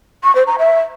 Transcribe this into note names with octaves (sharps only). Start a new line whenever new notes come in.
C#6
C5
A#5
E5